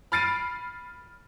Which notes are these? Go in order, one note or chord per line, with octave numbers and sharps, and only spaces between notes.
B5 F6 A6 C7 D7 D#7